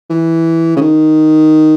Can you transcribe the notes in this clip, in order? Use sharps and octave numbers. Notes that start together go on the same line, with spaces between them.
E3
C#3
D#3